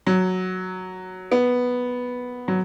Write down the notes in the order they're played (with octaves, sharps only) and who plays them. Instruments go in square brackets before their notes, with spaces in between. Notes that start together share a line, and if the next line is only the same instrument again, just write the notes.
[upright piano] F#3
B3
F#3